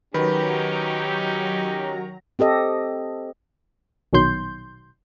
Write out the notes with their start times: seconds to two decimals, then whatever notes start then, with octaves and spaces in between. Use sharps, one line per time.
0.14 D#3 F#3 C#4 D#4 G4 B4 A#5
2.39 C4 G4 A4 D#5
4.13 A#1 B2 D#3 F#3 C6 G6